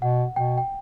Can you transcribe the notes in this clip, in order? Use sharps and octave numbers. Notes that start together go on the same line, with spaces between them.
B2 F#5
B2 G5
G5